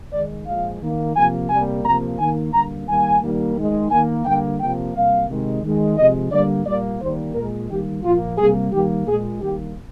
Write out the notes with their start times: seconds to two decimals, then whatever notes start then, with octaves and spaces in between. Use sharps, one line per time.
0.13 D#3 G#3 D5
0.46 A#2 F3 G#3 F5
0.81 D#3 A#3
1.15 C3 F3 A#3 G#5
1.50 C3 G3 A#3 G#5
1.84 C3 F3 A#3 A#5
2.19 D#3 A#3 G#5
2.53 D3 G3 A#3 A#5
2.87 D#3 G3 A#3 G#5
3.22 D#3 G3 A#3
3.56 D#3 G#3
3.90 D#3 A#3 G#5
4.25 D3 G3 A#3 G5
4.60 C3 F3 A#3 G5
4.94 C3 G3 A#3 F5
5.29 C3 D#3 G#3
5.63 D#3 G#3
5.97 C3 F3 G#3 D#5
6.32 D3 G3 A#3 D5
6.66 A#2 G3 A#3 D5
7.00 D#3 G3 A#3 C5
7.35 A#2 G#3 A#4
7.70 D#3 G3 A#3 G4
8.04 A#2 F3 A#3 F4
8.38 C3 G3 A#3 G#4
8.73 D#3 G3 A#3 G4
9.07 A#2 G#3 G#4
9.42 D#3 G3 A#3 G4